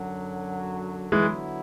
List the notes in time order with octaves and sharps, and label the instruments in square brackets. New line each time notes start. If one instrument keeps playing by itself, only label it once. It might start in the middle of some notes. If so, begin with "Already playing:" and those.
Already playing: [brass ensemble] F#2 D3 F#3
[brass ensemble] D3 F#3 B3 E4 [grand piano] E3 G#3